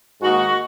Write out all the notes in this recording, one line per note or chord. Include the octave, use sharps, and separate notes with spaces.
G#2 D#3 A#3 F#4